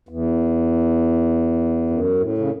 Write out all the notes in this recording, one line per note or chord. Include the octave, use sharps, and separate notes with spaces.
E2
F#2
A2
C#3